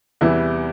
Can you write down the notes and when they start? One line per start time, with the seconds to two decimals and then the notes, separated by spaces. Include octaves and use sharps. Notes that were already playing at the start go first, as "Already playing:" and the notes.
0.21 E2 C3 E3 G3 E4